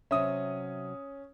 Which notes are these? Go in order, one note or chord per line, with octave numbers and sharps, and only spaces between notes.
C3 F#3 C#4 E5 D#6